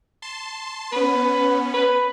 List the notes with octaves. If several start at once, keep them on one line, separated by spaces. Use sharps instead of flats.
A5 C6
B3 C#4 B4
B4